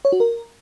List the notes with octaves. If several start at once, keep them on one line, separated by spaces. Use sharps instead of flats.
C#5
F#4
A#4